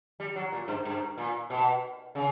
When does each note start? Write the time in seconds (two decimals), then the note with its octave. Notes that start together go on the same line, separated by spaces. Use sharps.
0.20 G3
0.36 F#3
0.52 A#2
0.68 G2
0.85 G2
1.18 A#2
1.50 B2
2.15 C#3